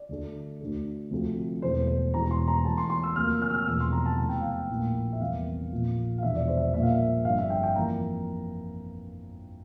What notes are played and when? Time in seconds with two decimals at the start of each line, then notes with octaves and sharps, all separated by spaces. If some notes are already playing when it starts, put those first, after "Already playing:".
Already playing: D5
0.09 D2 D3 A3
0.60 D2 D3 A3
1.11 D2 C3 F3 A3
1.62 E1 E2 E3 A3 C5
1.88 C5
2.14 E1 E2 E3 A#5
2.31 C6
2.48 A#5
2.65 E2 E3 A3 A5
2.78 C6
2.90 C6
3.04 E6
3.16 D2 C3 F3 A#3 F6
3.29 E6
3.42 F6
3.50 E6
3.54 F6
3.67 E1 E2 C3 F3 A3 E6
3.80 C6
3.92 A#5
4.06 A5
4.18 F1 E2 E3 A5
4.29 G5
4.41 F5
4.52 G5
4.69 A#1 A2 F3 A#3
5.13 E5
5.20 E2 C3 G3 A#3 F5
5.72 A#1 A#2 F3
6.18 F5
6.23 E1 E2 D3 F3 E5
6.35 D5
6.48 C5
6.57 E5
6.60 D5
6.73 A#1 A#2 G3 A#3 E5
6.83 F5
6.92 E5
7.24 G1 F2 D3 G3 F5
7.38 E5
7.50 G5
7.63 G5
7.76 F2 E3 A#3 A#5